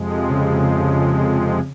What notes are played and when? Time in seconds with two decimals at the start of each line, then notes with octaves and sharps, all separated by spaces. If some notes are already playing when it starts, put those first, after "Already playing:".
Already playing: F2 C3 F3 G#3
0.29 C#3
0.73 C#3